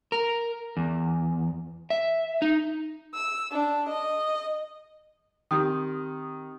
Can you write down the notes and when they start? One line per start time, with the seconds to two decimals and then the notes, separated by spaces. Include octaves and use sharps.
0.12 A#4
0.77 E2
1.90 E5
2.42 D#4
3.14 E6
3.52 D4
3.89 D#5
5.51 D#3 C4 G4 D#6